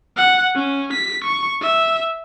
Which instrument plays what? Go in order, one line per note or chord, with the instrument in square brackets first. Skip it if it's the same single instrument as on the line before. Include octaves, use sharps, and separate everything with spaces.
[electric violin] F#5
C#4
B6
C#6
E5